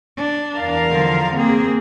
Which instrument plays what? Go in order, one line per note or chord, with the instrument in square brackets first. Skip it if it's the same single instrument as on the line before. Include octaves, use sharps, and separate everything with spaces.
[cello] D4
[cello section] E2 A#4 F5
[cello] D3 F3
[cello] A#3 [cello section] C4 G#4